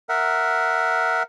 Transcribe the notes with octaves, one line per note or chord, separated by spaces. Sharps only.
A#4 E5 F#5